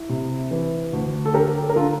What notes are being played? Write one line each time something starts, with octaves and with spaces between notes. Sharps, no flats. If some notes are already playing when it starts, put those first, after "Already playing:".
Already playing: E4
C3
E3
D2
A4
D3 G4 A#4
A4
A#4
D3 F4 A4